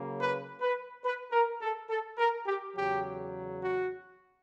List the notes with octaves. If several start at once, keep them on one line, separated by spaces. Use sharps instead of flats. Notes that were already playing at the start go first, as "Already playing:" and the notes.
Already playing: C#3 F#3 A#3
B4
B4
B4
A#4
A4
A4
A#4
G4
E2 C#3 F#3 G4
F#4